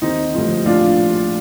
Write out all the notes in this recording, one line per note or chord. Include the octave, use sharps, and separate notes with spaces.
D#2 D#3 C4 D#4
A1 G2 D3 F3
A#1 A2 F3 D4 F4